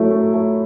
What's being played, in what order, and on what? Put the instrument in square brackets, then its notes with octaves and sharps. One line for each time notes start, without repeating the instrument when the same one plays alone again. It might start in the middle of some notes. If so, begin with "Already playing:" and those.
Already playing: [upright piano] F#3 A3 E4
A3
A3